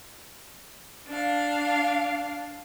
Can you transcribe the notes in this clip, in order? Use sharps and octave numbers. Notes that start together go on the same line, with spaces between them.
D4 F5